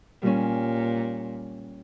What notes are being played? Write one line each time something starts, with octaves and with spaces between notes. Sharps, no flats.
A#2 G3 C#4